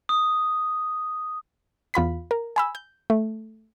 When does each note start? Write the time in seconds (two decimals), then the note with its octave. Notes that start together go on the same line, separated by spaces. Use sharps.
0.09 D#6
1.94 E2 F4 B5 B6
2.31 A#4
2.56 G#5 B5 E6
2.75 G6
3.10 A3